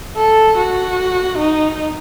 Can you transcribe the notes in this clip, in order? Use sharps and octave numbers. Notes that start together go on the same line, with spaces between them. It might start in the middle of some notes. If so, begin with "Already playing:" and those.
A4
F#4
D#4